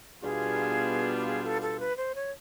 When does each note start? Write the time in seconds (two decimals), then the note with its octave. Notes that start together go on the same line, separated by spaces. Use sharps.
0.22 B2 G3 B3 D4 F4 G#4
1.16 G4
1.27 G#4
1.44 A4
1.62 A4
1.80 B4
1.97 C5
2.15 C#5